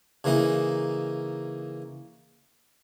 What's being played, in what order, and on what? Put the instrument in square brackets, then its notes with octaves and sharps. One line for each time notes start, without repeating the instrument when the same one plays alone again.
[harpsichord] C#3 E3 A#3 D#4